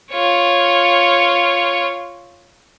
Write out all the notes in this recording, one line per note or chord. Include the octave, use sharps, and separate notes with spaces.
F4 C#5